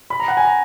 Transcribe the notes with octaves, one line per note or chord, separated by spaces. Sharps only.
B5
A#5
F#5
G#5
A#5